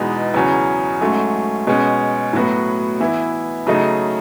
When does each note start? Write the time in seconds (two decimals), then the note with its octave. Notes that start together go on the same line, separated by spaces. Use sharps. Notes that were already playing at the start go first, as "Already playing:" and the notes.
Already playing: E2 B2 G#3 B3 D#4
0.34 E2 C#3 F#3 C#4
1.01 G#2 F#3 A3 C#4
1.67 B2 G#3 C#4
2.33 A2 F#3 B3 F#4
3.00 E3 B3 E4
3.67 C#3 F#3 A3 D#4